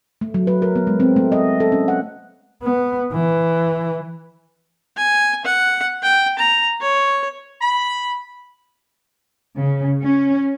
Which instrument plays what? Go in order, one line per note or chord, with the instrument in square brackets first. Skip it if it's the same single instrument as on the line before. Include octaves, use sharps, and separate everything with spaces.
[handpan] A3
F#3
B4
A#4
B3
G#3
C4
A3
D#5
A4
C#4
F#5
[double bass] B3
E3
[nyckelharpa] G#5
F#5
G5
A#5
C#5
[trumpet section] B5
[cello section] C#3
C#4